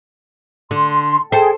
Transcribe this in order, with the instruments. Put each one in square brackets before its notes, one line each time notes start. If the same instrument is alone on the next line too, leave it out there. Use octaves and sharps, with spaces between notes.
[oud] D3 [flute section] C6
[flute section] G#4 G5 [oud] A4 C5